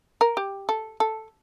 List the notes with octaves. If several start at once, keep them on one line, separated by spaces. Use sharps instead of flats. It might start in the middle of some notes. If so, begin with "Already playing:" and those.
A#4
G4
A4
A4